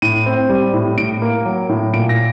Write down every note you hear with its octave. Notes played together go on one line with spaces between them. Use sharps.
A2 D#7
C4
G3
A2
A2 D7
A#3
F#3
A2
A#2 D7
A#6